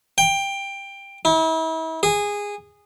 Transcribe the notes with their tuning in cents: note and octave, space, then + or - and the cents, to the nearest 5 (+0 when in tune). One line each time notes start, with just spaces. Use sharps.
G5 +15
E4 -40
G#4 -15